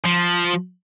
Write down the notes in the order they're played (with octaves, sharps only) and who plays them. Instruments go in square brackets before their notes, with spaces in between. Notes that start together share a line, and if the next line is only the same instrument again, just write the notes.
[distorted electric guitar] F3